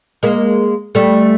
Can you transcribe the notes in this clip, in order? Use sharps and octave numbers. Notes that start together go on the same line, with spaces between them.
G#3 A#3
G3 A3